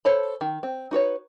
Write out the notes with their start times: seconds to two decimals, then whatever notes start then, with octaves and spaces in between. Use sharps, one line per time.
0.05 A4 C5 C#5 A5 B5
0.41 D#3
0.63 C4
0.91 D#4 F#4 B4 C#5